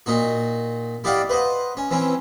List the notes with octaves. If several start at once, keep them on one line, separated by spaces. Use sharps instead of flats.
A#2 D#4 F#4
E4 G4 D5 D#5 F5 F#5
B4 C5 D#5 F#5
C#4
E3 C4 C#4